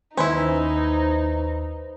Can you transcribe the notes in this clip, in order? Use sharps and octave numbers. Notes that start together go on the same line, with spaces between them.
D#2 C#4 D#4 E4 B4 C5